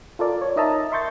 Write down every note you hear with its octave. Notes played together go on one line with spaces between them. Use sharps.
F4 A4 A#4 D5
C#5
D#4 A#4 D#5 E5 A5 A#5
E5 C6 C#6 G6 A6